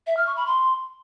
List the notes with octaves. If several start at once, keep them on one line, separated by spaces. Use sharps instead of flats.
E5
F6
C#6
B5
C6